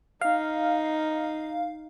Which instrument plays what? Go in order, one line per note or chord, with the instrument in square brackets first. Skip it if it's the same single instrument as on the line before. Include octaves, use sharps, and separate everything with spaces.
[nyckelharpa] D#4 [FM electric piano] F5